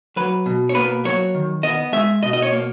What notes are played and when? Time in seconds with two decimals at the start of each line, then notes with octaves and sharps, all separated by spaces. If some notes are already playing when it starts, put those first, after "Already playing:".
0.16 F#3 B4
0.46 B2
0.69 C#5
0.75 A#3 B4
1.05 F#3 C#5
1.34 D#3
1.63 B3 D#5
1.93 G#3 E5
2.22 B2 D#5
2.33 D#5
2.42 C#5
2.52 A#3